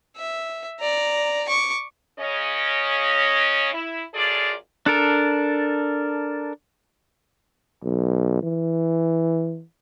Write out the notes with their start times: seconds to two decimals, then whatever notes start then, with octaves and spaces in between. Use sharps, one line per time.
0.17 E5
0.80 D5 A#5
1.48 C#6 D6
2.19 C#3 C#4 D#5
3.72 E4
4.14 F#2 F4 G#4 A4 D5
4.86 D4 A4 A#4
7.83 B1
8.43 E3